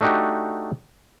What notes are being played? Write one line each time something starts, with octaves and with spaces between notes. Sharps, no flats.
A3 D4 D#4 F#4 G4